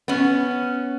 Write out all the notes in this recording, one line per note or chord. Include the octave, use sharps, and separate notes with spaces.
B3 C#4